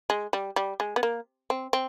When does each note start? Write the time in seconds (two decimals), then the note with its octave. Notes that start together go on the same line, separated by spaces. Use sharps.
0.10 G#3
0.33 G3
0.56 G3
0.80 G#3
0.96 B3
1.03 A#3
1.50 C4
1.73 C4